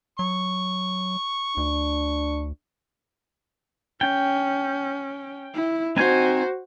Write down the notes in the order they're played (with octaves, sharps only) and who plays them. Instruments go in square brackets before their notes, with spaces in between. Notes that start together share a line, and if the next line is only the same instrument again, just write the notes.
[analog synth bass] F#3 [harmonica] C#6
[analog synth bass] D2 [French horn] D4
[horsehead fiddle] C#4 [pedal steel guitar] G5
[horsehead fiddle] E4
[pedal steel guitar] C4 D#4 G#5 [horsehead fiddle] F#4 C5